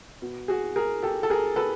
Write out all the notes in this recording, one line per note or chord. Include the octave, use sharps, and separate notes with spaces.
B2
F#4 G#4
G#4 A#4
G4 A4
A4
G#4 A#4
A4 B4